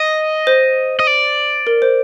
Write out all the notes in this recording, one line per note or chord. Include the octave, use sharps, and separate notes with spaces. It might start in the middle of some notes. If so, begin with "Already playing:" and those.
Already playing: D#5
C5
D#5
D5
A#4
C5